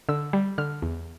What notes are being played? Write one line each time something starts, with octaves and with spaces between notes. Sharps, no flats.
D3 E6
G3
D3 F6
E2